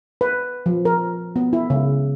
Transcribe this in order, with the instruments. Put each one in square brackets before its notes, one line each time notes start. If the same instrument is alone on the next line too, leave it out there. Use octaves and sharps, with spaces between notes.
[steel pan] B4
F3
A#4
B3
E4
C#3